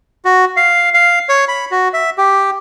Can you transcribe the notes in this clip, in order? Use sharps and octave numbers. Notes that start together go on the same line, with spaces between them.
F#4
F5
F5
C#5
B5
F#4
E5
G4